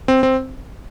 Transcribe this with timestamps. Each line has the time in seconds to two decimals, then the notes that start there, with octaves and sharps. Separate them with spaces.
0.08 C4
0.23 C4